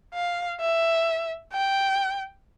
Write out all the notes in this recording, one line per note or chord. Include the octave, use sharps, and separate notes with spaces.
F5
E5
G5